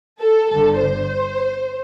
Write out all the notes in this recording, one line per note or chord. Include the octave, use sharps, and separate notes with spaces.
A4
G1 G2 D3 A4
C5